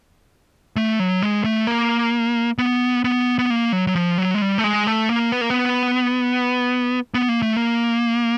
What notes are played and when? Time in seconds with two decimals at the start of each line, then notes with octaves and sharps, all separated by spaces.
0.76 A3
1.00 F#3
1.22 G#3
1.44 A3
1.67 A#3
2.58 B3
3.04 B3
3.39 B3
3.50 A#3
3.73 F#3
3.87 F#3
3.95 F3
4.18 F#3
4.35 G#3
4.42 G3
4.58 A3
4.64 G#3
4.87 A3
5.09 A#3
5.32 B3
5.41 A#3
5.50 B3
7.14 B3
7.29 A#3
7.42 A3
7.56 A#3